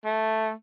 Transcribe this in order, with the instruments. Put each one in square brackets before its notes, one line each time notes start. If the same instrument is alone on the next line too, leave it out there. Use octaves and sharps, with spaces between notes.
[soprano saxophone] A3